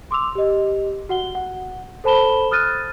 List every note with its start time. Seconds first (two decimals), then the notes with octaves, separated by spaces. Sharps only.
0.11 C6 D6 E6 F7
0.35 G4 D#5
1.09 F#4 F#5 G7
1.35 F#5
2.04 A4 C5 A5 B5 E7 G7
2.51 D#6 F6 F#6 A6 D#7